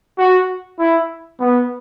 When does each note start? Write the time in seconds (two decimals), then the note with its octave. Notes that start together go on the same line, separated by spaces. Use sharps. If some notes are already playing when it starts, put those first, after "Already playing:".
0.18 F#4
0.79 E4
1.39 B3